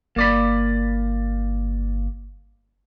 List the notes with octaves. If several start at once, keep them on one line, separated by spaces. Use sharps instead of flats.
G1 A#3 D5 B5